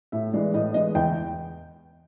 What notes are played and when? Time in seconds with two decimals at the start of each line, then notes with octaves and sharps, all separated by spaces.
0.12 A2 E5
0.33 E3 G#3 D5
0.54 A2 D#5
0.74 E3 G#3 D#5
0.95 E2 G5